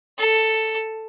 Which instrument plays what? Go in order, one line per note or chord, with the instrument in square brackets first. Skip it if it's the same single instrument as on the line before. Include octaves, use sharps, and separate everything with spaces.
[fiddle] A4